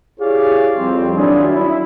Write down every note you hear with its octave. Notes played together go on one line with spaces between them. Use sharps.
E4 G4 G#4 C#5 D5 F5
F2 G3 C4
D#3 F#3 D4 E4 F4 G#4
E4